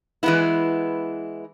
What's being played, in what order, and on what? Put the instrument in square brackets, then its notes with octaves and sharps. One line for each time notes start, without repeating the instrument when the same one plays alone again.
[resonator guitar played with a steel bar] E3 G#3 B3 E4